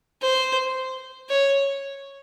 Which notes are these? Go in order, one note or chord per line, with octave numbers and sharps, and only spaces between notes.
C5
C#5